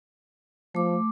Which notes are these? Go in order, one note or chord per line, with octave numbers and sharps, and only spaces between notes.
F3 A3 D6